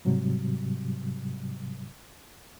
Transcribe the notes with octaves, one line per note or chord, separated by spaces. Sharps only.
G#2 C3 F#3 G3